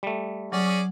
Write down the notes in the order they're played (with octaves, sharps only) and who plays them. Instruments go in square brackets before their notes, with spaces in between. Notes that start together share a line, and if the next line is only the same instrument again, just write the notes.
[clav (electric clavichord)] G3 A3
[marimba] F#3 [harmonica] C#4 G#4 D5